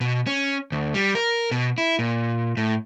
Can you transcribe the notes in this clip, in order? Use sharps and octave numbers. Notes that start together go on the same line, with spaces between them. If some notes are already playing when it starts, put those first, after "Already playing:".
B2
C#4
D2
G3
A#4
B2
E4
A#2
A2